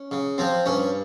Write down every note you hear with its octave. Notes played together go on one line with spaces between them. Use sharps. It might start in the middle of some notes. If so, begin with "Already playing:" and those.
Already playing: C#4
C#3
F3 C4
G2 C#4